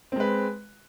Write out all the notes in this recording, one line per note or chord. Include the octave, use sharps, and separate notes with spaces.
G#3 C4 B4